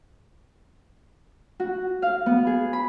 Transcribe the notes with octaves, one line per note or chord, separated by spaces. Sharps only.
F#4
F5
B3
G#4
B5